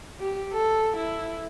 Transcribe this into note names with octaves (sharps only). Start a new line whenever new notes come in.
G4
A4
E4